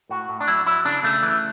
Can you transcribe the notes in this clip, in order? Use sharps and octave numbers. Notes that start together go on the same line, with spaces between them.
A2 F#4
A2
D4
F#3 E4
F#3 E4
C#3 D4
C#3 A3
E3